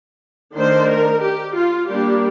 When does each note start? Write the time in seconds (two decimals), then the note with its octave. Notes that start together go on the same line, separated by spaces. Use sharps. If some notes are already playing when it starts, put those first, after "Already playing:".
0.56 D#3 A3 D4 C5
0.89 A#4
1.22 G4
1.57 F4
1.89 G3 A#3 D4 G4